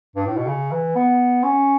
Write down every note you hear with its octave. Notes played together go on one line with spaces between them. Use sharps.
G2
A2
B2
C#3
E3
B3
C#4